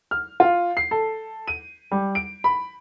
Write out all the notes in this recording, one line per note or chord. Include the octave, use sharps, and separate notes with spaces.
F6
F4
C7
A4
D#7
G3
D7
B5